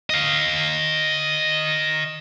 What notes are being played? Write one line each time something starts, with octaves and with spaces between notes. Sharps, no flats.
D#5 F5